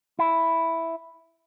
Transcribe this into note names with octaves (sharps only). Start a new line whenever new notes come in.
E4